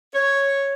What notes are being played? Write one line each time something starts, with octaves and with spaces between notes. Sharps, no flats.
C#5